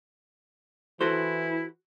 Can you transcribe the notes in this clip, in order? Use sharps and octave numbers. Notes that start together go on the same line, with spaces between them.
E3 E4 F#4 A4 C5